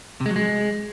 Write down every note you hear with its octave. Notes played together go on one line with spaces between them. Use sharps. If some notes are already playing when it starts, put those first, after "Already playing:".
C3
G#3
F#3
G#3